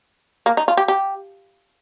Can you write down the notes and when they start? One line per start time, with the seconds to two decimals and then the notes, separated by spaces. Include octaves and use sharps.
0.46 A#3
0.57 D#4
0.68 F4
0.77 G4
0.88 G4